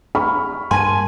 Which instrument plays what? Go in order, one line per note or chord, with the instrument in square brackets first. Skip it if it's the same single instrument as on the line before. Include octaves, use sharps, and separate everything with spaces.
[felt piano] B5 C#6 F6
[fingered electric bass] G2 A#3 [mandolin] G#5 [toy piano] A5 C6